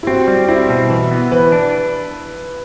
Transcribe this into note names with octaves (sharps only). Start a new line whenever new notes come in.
E4
C4 F#4
G3
C4 E4
B2
E3
B3
E3 B4
D4